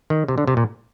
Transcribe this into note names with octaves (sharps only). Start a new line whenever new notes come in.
D#3
C3
D3
C3
A#2